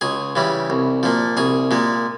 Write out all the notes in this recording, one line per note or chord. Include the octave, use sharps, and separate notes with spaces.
C#2 G#4
C#3 E3 G3
C2
A#2 F3
C2 G#4
A#2 G#3